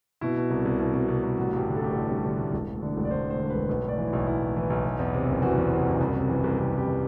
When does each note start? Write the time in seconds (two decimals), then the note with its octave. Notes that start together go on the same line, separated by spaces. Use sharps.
0.21 B2 E4
0.36 B2
0.50 C2
0.65 C2
0.79 B2 E4
0.94 B2
1.08 C2
1.23 C2
1.37 A1 F#4
1.53 G2 G4
1.67 D3
1.76 A4
1.81 A1 G4
1.92 A1 A4
2.10 G2
2.25 D3
2.39 A1
2.53 E1
2.67 D2
2.82 D3
2.97 E1
3.05 D5
3.11 E1 C5
3.26 D2 C5
3.40 D3
3.50 E1 B4
3.69 B1 B4
3.83 A2
3.88 D5
3.98 E3
4.08 E4
4.13 B1
4.27 B1 E4
4.41 A2
4.56 E3
4.70 B1
4.84 E3
4.99 E2
5.14 C3
5.28 F#1
5.42 E3 F#4
5.58 E2
5.72 C3
5.86 F#1
6.00 C2
6.15 C3
6.29 E3
6.44 C2
6.58 C2 G4
6.72 C3
6.78 G4
6.87 E3